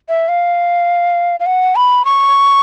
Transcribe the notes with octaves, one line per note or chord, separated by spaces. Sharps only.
E5
F5
F5
F#5
B5
C#6